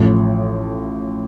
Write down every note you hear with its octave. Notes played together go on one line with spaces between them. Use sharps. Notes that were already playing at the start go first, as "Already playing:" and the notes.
Already playing: A1 A2 F3